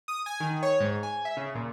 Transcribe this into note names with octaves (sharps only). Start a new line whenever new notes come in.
D#6
G#5
D#3
C#5
G#2
G#5
E5
C#3
A#2